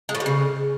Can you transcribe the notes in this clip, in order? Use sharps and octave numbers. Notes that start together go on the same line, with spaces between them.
G#3
A2
G3
C#3